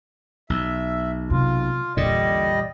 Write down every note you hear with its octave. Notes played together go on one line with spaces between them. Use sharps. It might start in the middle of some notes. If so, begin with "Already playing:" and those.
B1 E5
C3 G#3 F4
A#1 E2 A#2 D3 G3 D5 D#5